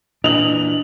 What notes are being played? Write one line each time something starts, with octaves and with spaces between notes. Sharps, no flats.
A#2 E3 D4 D#5 F7 F#7